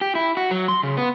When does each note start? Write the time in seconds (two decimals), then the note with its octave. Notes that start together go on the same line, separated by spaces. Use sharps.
0.01 G4
0.15 E4
0.37 F#4
0.51 F#3
0.68 C6
0.83 C#3
0.97 B3